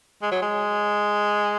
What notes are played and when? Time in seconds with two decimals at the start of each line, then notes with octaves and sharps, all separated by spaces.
0.22 G#3
0.32 F#3
0.42 G#3